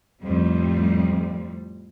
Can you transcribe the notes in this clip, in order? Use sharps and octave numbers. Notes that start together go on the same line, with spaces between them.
F2 A2 G3